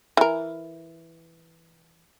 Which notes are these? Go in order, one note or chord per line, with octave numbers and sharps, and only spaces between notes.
E3 A#4